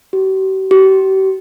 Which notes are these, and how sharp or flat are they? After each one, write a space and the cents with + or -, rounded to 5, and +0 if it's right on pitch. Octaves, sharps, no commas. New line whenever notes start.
G4 -45
G4 -40